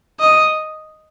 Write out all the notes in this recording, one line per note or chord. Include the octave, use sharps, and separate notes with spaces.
D#5